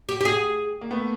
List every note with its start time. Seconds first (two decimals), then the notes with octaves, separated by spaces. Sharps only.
0.09 G4
0.21 G4
0.25 G#4
0.81 A#3
0.91 A3 B3